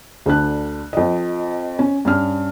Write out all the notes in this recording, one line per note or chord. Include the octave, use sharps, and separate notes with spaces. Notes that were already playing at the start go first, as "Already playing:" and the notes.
D2 D3 D4 F#6
F2 D#5
C#4
G2 C#4 F6